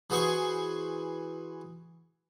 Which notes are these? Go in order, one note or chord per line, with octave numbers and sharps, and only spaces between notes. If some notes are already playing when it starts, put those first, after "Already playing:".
E3 F#4 G#4 C5 G#5 C#6